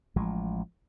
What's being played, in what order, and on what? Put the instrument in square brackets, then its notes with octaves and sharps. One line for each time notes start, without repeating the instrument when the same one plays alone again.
[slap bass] A1 F3 G#3